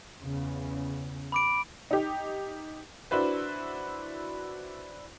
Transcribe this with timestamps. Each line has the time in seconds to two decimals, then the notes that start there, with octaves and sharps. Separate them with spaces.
0.19 E2 C#3
1.32 B5 D6 D7
1.91 D#4 G4
3.11 D4 E4 F#4 B4 C5